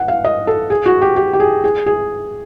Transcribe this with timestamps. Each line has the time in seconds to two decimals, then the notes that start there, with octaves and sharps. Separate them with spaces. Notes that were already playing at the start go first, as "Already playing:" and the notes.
Already playing: F#5
0.08 F5
0.25 D#5
0.47 A4
0.70 G#4
0.86 F#4
1.02 G4
1.16 G4
1.33 G4
1.40 G#4
1.64 G#4
1.86 G#4